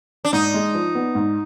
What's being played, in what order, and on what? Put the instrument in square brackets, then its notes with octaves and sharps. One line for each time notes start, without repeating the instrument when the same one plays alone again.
[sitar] D4
[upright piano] G#2 [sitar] D#4
[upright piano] G#3
F3
B3
G#2